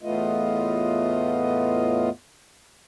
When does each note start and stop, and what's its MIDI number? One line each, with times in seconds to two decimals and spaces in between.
0.02 2.09 40
0.02 2.09 45
0.02 2.09 57
0.02 2.09 59
0.02 2.09 65
0.02 2.09 75